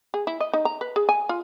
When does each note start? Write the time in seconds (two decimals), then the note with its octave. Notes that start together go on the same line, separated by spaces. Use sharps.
0.14 G#4
0.27 E4
0.40 D#5
0.53 D#4
0.65 A#5
0.81 B4
0.96 G#4
1.09 G#5
1.29 F4